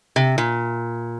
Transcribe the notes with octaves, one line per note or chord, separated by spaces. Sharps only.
C3
A#2